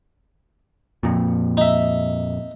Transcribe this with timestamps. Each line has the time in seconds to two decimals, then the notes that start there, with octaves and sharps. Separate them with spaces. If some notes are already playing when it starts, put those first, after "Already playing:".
1.03 F2 A#2
1.57 D#4 E5